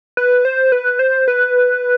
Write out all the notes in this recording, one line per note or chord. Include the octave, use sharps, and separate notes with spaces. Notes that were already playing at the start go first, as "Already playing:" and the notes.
B4
C5
B4
C5
B4